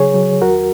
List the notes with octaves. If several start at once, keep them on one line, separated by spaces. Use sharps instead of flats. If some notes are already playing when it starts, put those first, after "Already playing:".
Already playing: C#3 F#3 G#4 C#5
F#3
D#2 F#4 A#4